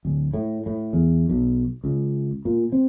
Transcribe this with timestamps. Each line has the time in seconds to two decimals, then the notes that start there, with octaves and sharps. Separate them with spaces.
0.05 D1
0.34 A2
0.66 A2
0.93 E2
1.29 B1
1.84 C#2
2.45 A#2
2.72 C4